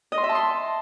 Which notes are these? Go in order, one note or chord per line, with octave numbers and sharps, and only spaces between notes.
D#5
C6
E5
A5
C6